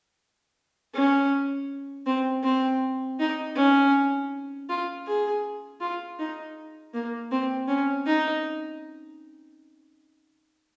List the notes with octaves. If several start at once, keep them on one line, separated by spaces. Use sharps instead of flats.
C#4
C4
C4
D#4
C#4
F4
G#4
F4
D#4
A#3
C4
C#4
D#4